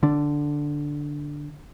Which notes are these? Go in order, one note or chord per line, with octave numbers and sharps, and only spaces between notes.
D3 D4